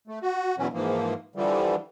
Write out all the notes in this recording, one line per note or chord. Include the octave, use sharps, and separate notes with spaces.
A3
F#4
E2 B2 E3 F#3 C#4
G#2 E3 F3 A#3
D3 E3 F3 G3